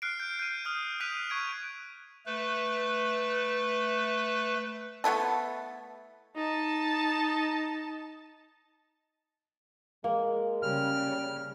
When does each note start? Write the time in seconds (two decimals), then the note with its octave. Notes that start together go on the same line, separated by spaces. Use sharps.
0.02 F6 F#6 C7 D7
0.20 G6 D7
0.39 G6 D#7
0.65 D#6 F6 G6
1.00 D#6 F6 F#6 B6 D#7 F7
1.30 C#6 G#6 D7
2.26 A3 B4
5.04 A3 B3 E4 A4
6.36 D#4 A5
10.04 G#3 A#3
10.63 C#3 G3 F6